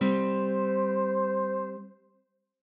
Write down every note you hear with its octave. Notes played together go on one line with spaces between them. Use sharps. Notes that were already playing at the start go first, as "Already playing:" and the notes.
G3 C4 C5